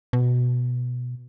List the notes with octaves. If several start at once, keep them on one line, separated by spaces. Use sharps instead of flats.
B2